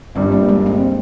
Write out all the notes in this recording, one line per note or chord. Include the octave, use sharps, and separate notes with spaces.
G1 G2 G3 C4
A#3
G#3
C4